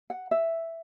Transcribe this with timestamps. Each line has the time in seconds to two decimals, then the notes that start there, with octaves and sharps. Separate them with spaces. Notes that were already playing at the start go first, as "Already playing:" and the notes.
0.10 F#5
0.31 E5